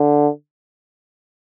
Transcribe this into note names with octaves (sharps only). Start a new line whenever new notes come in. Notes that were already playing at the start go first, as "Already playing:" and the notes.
Already playing: D3